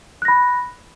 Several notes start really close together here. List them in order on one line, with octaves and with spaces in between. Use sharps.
F#6 A#6 B5